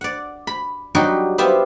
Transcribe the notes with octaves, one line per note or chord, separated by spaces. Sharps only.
D5 F#5
B5
F#3 G3 D#4 F#4 G4
B3 F4 G4 C5 E5